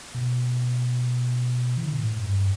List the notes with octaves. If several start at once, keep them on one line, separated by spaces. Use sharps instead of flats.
B2
E3
D3
B2
A2
A2
G2